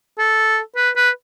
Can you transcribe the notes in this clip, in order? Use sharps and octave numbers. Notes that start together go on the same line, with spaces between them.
A4
B4
B4